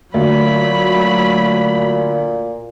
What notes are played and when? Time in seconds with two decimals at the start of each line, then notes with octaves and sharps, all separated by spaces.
0.14 D2 A#2 F#3 B5